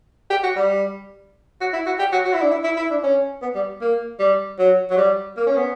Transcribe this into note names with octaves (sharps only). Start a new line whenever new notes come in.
G4
F#4
G3
F#4
E4
F#4
G4
F#4
F#4
E4
D4
E4
E4
E4
D4
C#4
B3
G3
A#3
G3
F#3
F#3
G3
A#3
C#4
B3